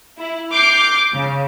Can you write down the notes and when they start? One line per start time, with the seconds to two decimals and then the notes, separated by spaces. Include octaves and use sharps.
0.18 E4
0.52 D6 F6 G6 C7
1.12 C#3